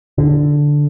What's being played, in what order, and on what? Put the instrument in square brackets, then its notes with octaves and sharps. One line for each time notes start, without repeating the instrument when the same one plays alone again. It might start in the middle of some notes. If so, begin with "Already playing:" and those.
[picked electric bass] D3